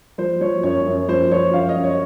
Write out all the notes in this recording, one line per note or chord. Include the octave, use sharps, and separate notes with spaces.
F3 C5
F3 C#5
F#2 C#5
F#2
F3 C5
F3 C#5
F#2 F5
D#5
F#2
C#5